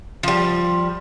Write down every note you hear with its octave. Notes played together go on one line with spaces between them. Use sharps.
F3 G3